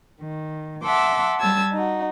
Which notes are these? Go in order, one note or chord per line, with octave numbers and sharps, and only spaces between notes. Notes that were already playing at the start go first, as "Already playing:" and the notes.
D#3
E5 F#5 A5 C6 D6 E6
G3 A5 E6 G#6
D#4 F#4